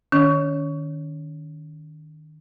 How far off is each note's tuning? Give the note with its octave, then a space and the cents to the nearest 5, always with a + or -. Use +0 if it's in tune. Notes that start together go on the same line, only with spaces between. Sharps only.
D#3 -15 C#4 +30 C#5 +5